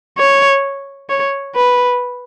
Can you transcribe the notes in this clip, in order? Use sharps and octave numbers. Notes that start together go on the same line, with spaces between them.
C#5
C#5
B4